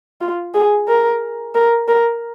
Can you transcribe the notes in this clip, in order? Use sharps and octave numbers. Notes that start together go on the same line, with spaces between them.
F4
G#4
A#4
A#4
A#4